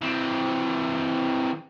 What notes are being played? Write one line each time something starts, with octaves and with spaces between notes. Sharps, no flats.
E3 C4